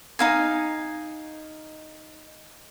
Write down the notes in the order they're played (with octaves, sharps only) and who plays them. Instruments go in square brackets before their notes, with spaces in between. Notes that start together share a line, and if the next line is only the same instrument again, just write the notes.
[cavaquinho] D#4 F5 G#5